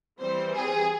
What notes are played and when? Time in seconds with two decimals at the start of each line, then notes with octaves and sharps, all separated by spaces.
0.19 E3 G3 C4 C5
0.53 G#4